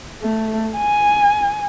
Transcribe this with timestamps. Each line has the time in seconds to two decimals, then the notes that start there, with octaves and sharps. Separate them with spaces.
0.23 A3
0.77 G#5